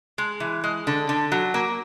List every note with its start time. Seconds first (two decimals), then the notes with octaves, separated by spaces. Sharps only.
0.18 G#3
0.40 E3
0.64 G#3
0.87 D3
1.09 D3
1.32 F#3
1.54 A#3